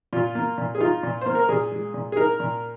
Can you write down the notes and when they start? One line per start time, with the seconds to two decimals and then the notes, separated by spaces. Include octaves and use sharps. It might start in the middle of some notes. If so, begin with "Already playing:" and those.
0.13 A#2 F4
0.35 A#3
0.58 A#2
0.75 G#4
0.80 D#4 F4
1.03 A#2
1.21 A#3 C5
1.35 A#4
1.49 A#2 G#4
1.72 G#3
1.94 A#2
2.12 G#4
2.17 D#4 A#4
2.40 A#2